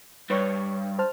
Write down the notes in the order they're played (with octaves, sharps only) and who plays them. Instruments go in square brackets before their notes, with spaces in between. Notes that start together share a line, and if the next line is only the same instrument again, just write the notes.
[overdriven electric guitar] G2 [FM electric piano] B4 C#5 C#6
[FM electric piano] C5 A5 F6